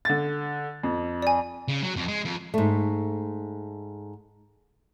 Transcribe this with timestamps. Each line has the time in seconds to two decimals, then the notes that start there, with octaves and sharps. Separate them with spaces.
0.05 D3 A6
0.83 F2
1.22 D5 G#5
1.68 C#3
1.83 F#3
1.96 F2
2.08 G#3
2.25 F2
2.54 G#2 A3